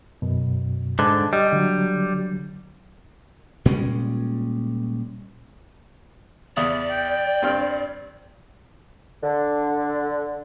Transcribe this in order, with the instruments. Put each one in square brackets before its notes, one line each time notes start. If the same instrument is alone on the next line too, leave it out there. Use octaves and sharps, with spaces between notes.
[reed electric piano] F#2 B2
[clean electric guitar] G#2 D3 [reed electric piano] A5 D6 F#6
[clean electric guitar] G3 [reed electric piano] D#5
[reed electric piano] D3 F#3
[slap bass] A#2 G3 G#3 C#4
[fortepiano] E2 E5 D#6 [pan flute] D5
[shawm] G5
[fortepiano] G2 C4 F6
[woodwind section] D3